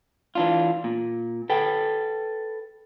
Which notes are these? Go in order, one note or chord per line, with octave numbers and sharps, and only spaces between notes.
E3 D4 F4
A#2
A4 B4 G5